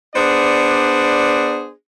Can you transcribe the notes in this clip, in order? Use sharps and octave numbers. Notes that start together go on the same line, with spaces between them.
B3 D4 G#4 C5 D5